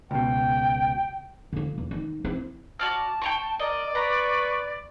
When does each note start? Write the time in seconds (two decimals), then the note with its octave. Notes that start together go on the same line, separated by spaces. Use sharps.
0.11 C#2 B2 G5
1.53 D3 F4
1.78 E2
1.91 D#3
2.25 C4 E4
2.79 F#4 D5 A5 F6
3.22 G5 A#5 C#6
3.60 A#4 D5 D#5
3.95 B4 A#5 C#6